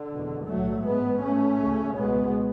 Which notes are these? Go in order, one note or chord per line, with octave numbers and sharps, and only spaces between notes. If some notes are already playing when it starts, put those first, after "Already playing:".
Already playing: D3
F#1 E2 B2
B1 A2 F#3 A3
A1 G#2 G#3 B3
A1 A2 A3 C#4
D2 C#3
C#2 B2 G#3 B3